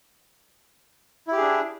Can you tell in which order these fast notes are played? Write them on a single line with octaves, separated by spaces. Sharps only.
E4 G4 G#4 D4